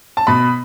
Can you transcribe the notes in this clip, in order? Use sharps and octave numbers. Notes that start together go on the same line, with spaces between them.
A5
B2 B5